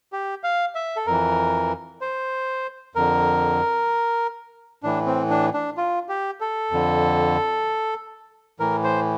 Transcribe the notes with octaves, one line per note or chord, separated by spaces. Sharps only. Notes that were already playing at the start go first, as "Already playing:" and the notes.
G4
F5
E5
A4
F2 E3 A#4
C5
F2 D3 A#4
A2 E3 D4
C4
D4
D4
F4
G4
A4
F2 D3
A2 E3 A#4
C5